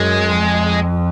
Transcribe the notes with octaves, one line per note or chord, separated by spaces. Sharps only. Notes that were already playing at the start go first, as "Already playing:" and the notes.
Already playing: F#2 G#3
F2